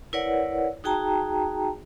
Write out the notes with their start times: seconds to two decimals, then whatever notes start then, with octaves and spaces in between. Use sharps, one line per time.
0.13 E4 A#4 B4 C#5 D5 F#5
0.84 D#4 F#4 G#4 G5 A5 A#5